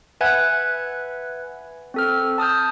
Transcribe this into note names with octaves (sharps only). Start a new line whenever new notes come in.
B4 E5 F#5 G#5 F#6 G#6
C4 A4 F6
A5 D#6 F6 G6